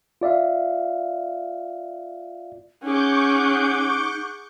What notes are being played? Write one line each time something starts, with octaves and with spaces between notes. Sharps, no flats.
F4 D5 E5 F5
C#4 D#4 G#4 F#5 C#6 D6 G6